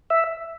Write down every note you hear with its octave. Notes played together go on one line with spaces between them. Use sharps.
E5